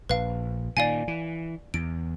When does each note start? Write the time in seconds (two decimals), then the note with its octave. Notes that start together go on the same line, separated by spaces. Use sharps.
0.09 A#1 B4 F5
0.77 A#2 D#3 D5 F5 G#5
1.08 E3
1.74 E2 D7